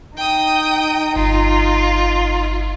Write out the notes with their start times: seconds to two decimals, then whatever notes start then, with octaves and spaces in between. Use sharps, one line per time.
0.17 D#4 G5 D#6
1.16 G1 F4